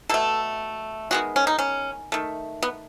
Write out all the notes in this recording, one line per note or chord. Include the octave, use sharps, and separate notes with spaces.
B2 A3 A4
D#3 G#3 B3 F#4
C#4
D#4
C#4
D#3 A3
B3